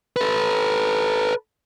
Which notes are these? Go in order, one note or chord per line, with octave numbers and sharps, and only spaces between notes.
A4 B4